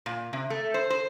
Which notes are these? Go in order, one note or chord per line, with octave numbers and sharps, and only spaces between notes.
A#2
C3
A3
C5
C5